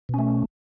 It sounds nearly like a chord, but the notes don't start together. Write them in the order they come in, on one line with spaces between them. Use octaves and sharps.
B2 C#4 A3